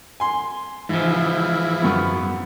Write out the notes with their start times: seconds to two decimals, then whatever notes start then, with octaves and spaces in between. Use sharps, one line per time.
0.20 G#5 C6
0.89 G#2 E3 F3
1.82 F#2 B3